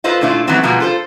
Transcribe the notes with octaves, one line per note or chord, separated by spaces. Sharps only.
F4 A4 B4 C5 D#5 F5
A#2 A3 D4 E4 F4
D#3 E3 F#3 A3 B3 C4
B2 F3 G#3 A#3 B3
F4 A4 C5